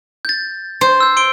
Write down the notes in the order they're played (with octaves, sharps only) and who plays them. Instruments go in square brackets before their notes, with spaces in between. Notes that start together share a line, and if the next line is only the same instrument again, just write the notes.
[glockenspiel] G6 A6
[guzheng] C5
[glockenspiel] E6 G6
C6 D7 G7